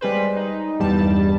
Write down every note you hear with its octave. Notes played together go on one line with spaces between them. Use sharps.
G3 G#3 B4 C5
D#4
E2 G2 G3 A5